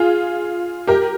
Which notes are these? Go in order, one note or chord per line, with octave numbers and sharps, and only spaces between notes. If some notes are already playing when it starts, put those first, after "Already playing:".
Already playing: F4 G#4
G4 A#4